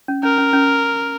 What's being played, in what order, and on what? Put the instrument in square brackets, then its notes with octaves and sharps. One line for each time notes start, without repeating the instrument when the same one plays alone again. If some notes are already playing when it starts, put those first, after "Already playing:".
[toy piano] C#4
[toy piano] C#4 [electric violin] A#4
[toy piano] C#4
C#4